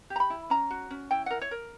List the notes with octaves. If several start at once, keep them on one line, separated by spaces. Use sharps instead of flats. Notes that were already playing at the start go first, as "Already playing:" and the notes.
G4
A#5
B5
E4
C#4 A#5
F#4
C#4
E4 G5
A#4 F#5
C#5
A#4